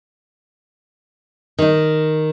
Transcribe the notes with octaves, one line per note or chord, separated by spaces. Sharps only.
D#3 D#4